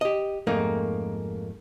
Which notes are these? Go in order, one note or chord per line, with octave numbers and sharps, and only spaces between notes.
G4 D#5
F2 G#2 A3 A#3 D#4